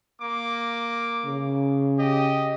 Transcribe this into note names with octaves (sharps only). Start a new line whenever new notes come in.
A#3 D6
C#3
G4 D#5